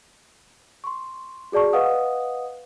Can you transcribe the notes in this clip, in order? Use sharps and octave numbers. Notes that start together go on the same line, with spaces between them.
C6 C#6
F#4 G#4 D5 A5 C#6
B4 D#5 F5 F#5 D#6